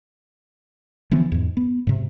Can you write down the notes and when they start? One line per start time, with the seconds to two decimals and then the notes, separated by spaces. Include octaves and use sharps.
1.11 D3 E3 F3 B3
1.32 E2 G#2
1.57 B3
1.87 G#2 C3